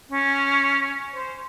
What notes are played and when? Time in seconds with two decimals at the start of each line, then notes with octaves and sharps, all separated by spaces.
0.09 C#4
1.13 C5